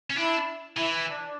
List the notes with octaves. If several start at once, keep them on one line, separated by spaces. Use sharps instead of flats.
C#4
D4 E4
E3 E4
D4